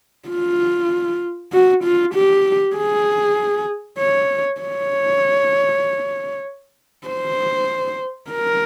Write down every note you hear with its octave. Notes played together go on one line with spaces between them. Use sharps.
F4
F#4
F4
G4
G#4
C#5
C#5
C5
A#4